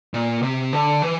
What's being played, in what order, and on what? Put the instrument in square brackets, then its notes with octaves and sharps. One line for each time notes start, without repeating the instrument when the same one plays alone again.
[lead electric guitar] A#2
C3
D3
E3